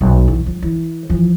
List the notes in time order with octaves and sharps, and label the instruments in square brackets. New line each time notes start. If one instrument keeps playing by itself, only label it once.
[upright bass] B1
E3
F3
E3
E3 F3